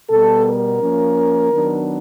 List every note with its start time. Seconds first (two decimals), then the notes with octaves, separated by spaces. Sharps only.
0.10 B2 G3 B3 A4
0.46 A#4
0.81 F3 A#3 C#4
1.51 D#3 F#3 B3 D4